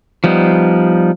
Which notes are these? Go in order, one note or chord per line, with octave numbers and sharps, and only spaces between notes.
F3 G3 B3 D#4